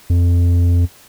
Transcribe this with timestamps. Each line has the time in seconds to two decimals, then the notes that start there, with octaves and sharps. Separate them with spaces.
0.10 F2